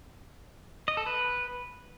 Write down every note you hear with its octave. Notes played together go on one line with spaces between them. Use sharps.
D#5
A4
B4